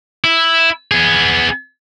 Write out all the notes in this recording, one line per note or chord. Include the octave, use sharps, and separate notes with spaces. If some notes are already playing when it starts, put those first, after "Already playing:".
E4
B3 G#4